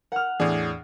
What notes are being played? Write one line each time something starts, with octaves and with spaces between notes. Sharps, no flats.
A#4 F#5 F6
E2 A2 D4 G#4